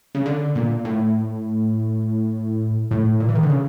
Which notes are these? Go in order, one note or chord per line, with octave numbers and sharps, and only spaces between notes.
C#3
D3
A#2
A2
A2
A#2
E3
D#3
D3
C#3